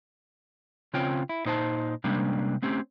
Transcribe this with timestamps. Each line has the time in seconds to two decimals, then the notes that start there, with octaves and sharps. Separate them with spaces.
0.93 C#3 C4 C#4 F4 C#5 G5
1.29 E4
1.45 A#2 D#4 C5 D5 A5
2.04 C3 G3 G#3 A#3 C#4 D4
2.62 A3 C4 C#4 G4